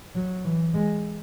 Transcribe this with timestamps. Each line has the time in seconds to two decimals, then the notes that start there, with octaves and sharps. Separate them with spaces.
0.15 F#3
0.45 E3
0.74 G#3